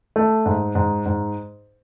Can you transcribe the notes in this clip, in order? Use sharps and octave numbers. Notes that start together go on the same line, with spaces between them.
A3
G#2
G#2
G#2